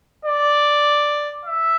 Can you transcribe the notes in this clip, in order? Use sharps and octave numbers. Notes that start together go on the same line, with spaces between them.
D5
E5